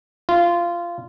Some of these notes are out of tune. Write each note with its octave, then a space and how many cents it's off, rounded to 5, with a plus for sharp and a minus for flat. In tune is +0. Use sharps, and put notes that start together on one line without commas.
F4 -15